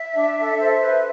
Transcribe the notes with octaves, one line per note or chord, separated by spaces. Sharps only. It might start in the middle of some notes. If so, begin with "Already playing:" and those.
Already playing: E5
D4
A4
C5
B4